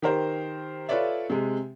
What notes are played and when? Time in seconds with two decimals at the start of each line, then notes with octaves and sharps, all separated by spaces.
0.02 D#3 G4 A#4 C5
0.89 F4 A4 B4 C#5 D5 E5
1.30 C3 G#3